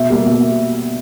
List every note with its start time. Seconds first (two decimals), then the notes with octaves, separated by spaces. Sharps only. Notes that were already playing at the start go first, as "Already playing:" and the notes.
Already playing: B2 E5
0.10 G3 A#3
0.26 B2